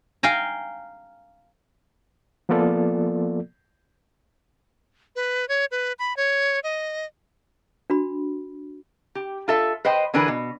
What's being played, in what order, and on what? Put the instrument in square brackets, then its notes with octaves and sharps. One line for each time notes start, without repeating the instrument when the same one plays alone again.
[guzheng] F5 G5 G#5 A#5
[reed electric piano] F3 A#3 B3 F4 A4 D5
[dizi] B4
C#5
B4
B5
C#5
D#5
[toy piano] D4 F#4 B5
[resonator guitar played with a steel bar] G4
F4 A4 E5
B4 C5 D#5 G5
D3 E3 D4 G#4 A#4 B4
B2